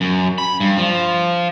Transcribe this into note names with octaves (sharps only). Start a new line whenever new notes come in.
F#2
B5
G2
F3